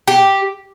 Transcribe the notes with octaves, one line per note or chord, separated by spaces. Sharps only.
G4